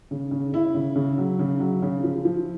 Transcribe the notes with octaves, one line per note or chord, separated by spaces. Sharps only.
C#3
C#3
C#3 E4
C#3
C#3
F#3
C#3
F#3
C#3
F3
F3